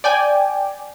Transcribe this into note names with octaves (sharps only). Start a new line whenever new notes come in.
D5 G5 G#5